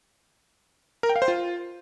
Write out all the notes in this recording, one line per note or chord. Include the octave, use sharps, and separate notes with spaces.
A#4
G5
F5
C5
F4